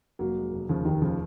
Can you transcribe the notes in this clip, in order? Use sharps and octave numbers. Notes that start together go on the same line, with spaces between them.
F1 F#3 A#3
G#3
F1
D#2 C#3 F3
F1 C3 D#3
C#3 F3